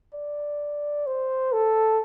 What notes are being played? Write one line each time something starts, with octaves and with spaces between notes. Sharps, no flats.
D5
C5
A4